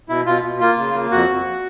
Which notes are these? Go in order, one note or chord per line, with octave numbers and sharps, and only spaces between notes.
B2 E4
B2 F4
B2
A#3 F4
C#3
A#3
F2 F#4
F2